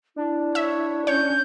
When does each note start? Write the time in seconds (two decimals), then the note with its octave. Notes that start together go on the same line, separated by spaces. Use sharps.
0.16 D4 E4
0.55 C#5 E5
1.07 C#4 C#5 G6